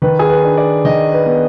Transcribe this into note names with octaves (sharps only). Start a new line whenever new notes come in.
D#3 B4
G#4
B4
D4
D5
D#3 D#5
B4
B3